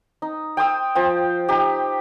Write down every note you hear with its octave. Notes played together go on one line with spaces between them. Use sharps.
D#4
G5 C6 D#6 E6
F3 C5 G5
D#4 G4